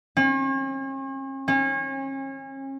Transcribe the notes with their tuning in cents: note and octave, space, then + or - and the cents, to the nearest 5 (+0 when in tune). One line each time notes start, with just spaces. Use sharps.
C#4 -45
C#4 -35